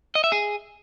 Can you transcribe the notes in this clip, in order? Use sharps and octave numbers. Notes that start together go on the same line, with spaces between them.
D#5
E5
G#4